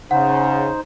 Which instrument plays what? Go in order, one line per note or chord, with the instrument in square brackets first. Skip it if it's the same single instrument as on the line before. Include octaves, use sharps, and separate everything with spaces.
[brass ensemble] C#3 [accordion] D#4 C5 [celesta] F#5